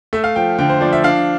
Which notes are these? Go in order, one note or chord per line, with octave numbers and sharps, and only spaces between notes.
A3 E5
F5
F3 G5
D3 G5
C5
F3 D5
E5
D4 F5